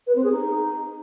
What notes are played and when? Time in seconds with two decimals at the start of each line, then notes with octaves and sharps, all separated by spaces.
0.06 B4
0.15 C4
0.23 G#4
0.32 D#4